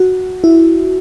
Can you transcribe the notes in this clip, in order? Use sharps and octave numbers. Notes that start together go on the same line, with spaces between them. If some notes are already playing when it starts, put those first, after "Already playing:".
Already playing: F#4
E4